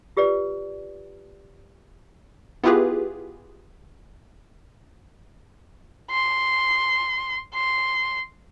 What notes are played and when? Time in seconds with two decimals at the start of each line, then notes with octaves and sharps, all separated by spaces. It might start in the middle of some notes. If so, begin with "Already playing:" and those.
0.17 F4 G4 B4 D5
2.64 B3 E4 F4 G4 G#4 B4
6.11 C6
7.54 C6